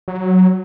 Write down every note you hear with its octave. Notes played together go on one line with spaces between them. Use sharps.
F#3